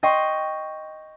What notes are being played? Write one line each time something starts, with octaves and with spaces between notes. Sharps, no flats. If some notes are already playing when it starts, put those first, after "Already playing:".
D#5 G5 C6 C#6